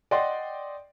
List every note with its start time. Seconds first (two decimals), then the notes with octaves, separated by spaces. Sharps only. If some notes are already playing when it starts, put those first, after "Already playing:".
0.11 D5 D#5 F#5 G5 C6